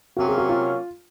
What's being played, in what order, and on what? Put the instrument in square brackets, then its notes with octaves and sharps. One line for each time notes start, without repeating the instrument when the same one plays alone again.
[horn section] C3 F#3 A#3 C#4 [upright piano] F#4
[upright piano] G#4
F#4
F4